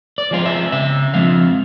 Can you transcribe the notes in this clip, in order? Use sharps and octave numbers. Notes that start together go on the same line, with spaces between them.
D5
F3 G#3 C4 F4
E5
C#3 E5
F3 G#3 C4 F4 F5